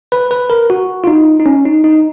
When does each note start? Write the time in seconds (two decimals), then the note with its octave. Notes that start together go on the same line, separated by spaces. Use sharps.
0.12 B4
0.31 B4
0.50 A#4
0.70 F#4
1.04 F4
1.07 D#4
1.40 D#4
1.46 C#4
1.65 D#4
1.84 D#4